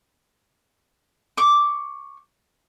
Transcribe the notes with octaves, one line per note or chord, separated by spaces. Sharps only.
C#6 D6